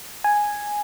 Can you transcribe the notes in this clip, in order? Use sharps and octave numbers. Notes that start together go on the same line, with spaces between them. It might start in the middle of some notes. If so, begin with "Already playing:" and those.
G#5